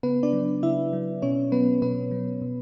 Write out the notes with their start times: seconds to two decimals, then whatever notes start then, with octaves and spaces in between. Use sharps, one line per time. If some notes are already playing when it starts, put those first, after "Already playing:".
0.03 C#3 B3 B4
0.23 D4 D5
0.33 F#3
0.63 C#3 E4 E5
0.93 F#3
1.22 B2 C#4 C#5
1.52 F#3 B3 B4
1.82 B2 B3 B4
2.11 F#3
2.42 B2